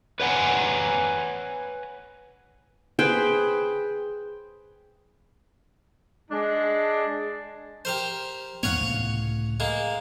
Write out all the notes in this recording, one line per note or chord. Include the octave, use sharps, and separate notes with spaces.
B4 C#5 F#5 G#5 A#5
G#4 B4 C5 G5
G#3 D4
G4 A#4 C5
E2 G#2 B3 C#5 F5 F#5
C#2 A2 C3
G#3 A#3